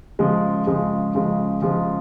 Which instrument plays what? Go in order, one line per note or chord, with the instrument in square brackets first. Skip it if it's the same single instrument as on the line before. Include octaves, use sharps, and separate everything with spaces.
[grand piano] C#3 F3 G#3
C#3 F3 G#3
C#3 F3 G#3
C#3 F3 G#3